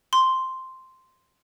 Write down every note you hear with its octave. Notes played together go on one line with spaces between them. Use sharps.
C6